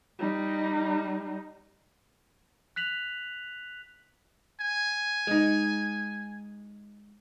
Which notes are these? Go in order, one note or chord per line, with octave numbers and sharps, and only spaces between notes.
G3 D#4
F#6 B6 F7 F#7
G#5
G#3 D#4